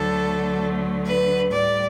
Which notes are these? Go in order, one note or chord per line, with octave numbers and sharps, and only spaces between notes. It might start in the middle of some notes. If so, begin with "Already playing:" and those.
Already playing: D2 D3 F#3 A3 A4
B4
A2 G3 D5